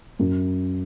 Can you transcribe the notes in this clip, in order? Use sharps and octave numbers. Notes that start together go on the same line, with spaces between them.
F#2